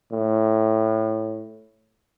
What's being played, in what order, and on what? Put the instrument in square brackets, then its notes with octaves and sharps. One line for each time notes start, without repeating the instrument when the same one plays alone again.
[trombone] A2